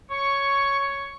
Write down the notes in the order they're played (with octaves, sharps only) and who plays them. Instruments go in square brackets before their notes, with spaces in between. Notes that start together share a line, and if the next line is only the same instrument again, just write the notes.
[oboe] C#5 [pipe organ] C#6